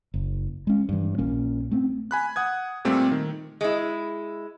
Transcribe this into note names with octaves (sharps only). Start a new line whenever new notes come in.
F#1
G#3 C#4
G2 E3
A#1 A#2 A#3 C#4
A3 C4 C#4
G#5 B5 F#6
F#5 D#6 G#6
A#2 G3 A3 C4 F4 G4
D#3
G#3 E4